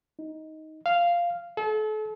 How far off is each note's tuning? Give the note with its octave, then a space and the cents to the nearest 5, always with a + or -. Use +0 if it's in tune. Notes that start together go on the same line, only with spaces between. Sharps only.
D#4 +10
F5 -5
A4 -35